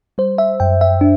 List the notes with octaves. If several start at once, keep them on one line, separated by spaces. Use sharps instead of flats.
G3 C5
E5
F#2 G5
E5
D4